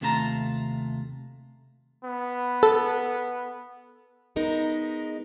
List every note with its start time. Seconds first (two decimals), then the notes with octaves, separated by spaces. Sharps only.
0.01 D#2 C3 A3 F4 A5 A#5
2.05 B3
2.63 A4
4.36 G#3 B3 D#4 A#4